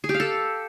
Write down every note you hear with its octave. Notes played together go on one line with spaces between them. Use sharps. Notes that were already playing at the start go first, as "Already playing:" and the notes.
G#4
G4
F5
A4